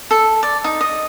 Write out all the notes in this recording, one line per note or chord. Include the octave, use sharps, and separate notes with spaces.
A4
D5
D#4
D#5